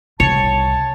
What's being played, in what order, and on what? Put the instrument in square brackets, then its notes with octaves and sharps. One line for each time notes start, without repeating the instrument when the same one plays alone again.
[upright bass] C2 [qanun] C#5 [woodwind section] A5